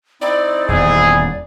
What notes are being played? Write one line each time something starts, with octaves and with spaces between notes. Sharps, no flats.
C4 D#4 E4 D5
D#1 E2 G#4 D5